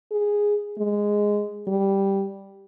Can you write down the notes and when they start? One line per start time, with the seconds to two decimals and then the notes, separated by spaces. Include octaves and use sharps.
0.11 G#4
0.78 G#3
1.67 G3